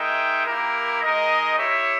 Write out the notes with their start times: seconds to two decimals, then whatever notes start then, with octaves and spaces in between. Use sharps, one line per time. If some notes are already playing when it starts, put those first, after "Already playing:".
Already playing: G#3 D#4 A#4 E5 G5
0.47 A#3 E4 G4 A#4
1.03 G#3 D#4 A#4 D#5
1.59 E4 G4 C#5 E5